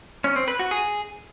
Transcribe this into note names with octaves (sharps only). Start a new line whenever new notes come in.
C#4
C4
B4
F#4
G#4